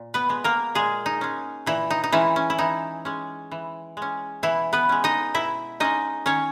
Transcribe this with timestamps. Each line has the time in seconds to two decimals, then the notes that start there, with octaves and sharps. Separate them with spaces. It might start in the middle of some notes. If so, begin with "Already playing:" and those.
Already playing: A#2
0.14 B3 B4
0.29 G#3 B3
0.44 A#3 A#4
0.75 A#2 G#3 G#4
1.06 D#4
1.21 G#3 C#4
1.66 A#2 E3 E4
1.90 D#4
2.04 D#4
2.12 E3 G#3 C#4 E4
2.36 C#4
2.50 E4
2.58 E3 D#4
3.05 G#3 C#4
3.51 E3
3.97 G#3 C#4
4.43 B2 E3 E4
4.73 B3 B4
4.89 G#3 C#4
5.04 D#4 D#5
5.34 B2 E4 E5
5.80 G#3 C#4 D#4 D#5
6.26 D#3 C#4 C#5